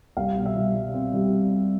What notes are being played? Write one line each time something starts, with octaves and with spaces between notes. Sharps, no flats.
C2 F5
B2
E5
G3
G3
C4
G3